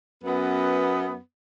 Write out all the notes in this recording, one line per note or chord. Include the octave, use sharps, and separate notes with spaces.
F#2 B3